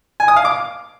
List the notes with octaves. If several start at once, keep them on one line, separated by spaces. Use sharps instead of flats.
G#5
D#6
F5
D6